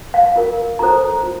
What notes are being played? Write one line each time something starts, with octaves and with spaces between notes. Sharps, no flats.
F5
F4 A#4
F4 A4 C5 A#5
F4